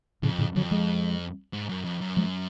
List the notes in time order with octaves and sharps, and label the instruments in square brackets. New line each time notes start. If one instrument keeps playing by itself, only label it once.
[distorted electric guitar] F2 [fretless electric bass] A2 C#3
[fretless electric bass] A2 C#3
[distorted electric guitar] F2 [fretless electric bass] D3 F#3
[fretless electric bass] F3 G#3
[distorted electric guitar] G#2
F#2
F2
F#2
[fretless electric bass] F3 G#3